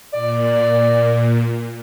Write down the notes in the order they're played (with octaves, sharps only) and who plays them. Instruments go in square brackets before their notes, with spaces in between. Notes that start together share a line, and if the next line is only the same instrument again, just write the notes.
[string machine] A#2 [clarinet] D5